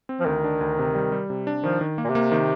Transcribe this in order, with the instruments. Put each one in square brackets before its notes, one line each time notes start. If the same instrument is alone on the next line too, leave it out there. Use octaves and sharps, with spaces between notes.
[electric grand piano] C4
[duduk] F3
[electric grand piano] D2 [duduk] D#3
[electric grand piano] D4
D2
C3
G3
G3
C3
D4
[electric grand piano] D#3 [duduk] F3
[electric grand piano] D#3
A#3
[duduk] A#2
C3
[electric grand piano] A#3
D#3